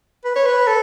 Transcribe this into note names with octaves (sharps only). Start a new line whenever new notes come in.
B4
C#5
B4
A4